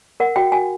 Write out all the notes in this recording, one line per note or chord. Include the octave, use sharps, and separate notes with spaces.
A#4 F#5
F#4 G5
F#4 G#5